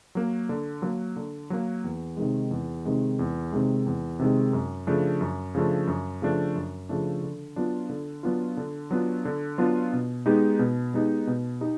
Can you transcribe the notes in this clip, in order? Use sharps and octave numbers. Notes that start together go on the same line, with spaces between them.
F#3 A#3
D3
F#3 A#3
D3
F#3 A#3
E2
C3 D#3 G#3
E2
C3 D#3 G#3
E2
C3 D#3 G#3
E2
C3 D#3 G#3
F#2
C#3 F3 A3 D4
F#2
C#3 F3 A3 D4
F#2
C#3 F3 A3 D4
F#2
C#3 F3 A3 D4
D3
F#3 B3 D4 F4
D3
F#3 B3 D4 F4
D3
F#3 B3 D4 F4
D3
F#3 B3 D4 F4
B2
G#3 B3 D#4 G4
B2
G#3 B3 D#4 G4
B2
D#4 G4